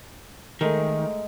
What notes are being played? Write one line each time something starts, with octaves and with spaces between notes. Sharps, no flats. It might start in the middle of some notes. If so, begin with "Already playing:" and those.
D#3 G#3 A3 A#4